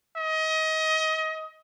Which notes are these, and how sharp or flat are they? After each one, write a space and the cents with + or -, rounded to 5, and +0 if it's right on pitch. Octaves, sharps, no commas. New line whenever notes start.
D#5 +30